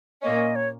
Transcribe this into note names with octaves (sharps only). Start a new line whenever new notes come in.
A#2 A#3 C#4 D#5
C#5